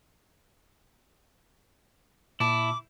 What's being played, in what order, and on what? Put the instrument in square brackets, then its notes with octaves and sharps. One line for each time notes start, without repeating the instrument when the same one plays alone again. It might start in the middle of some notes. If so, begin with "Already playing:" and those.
[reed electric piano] A#2 A5 [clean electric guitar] E4 [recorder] D6